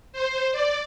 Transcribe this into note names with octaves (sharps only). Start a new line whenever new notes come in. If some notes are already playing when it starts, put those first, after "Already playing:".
C5
D5